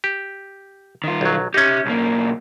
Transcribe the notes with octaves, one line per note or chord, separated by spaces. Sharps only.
G4
D#3 F4
B1 F#3
C#4 D#4 G4 E5
B1 A#3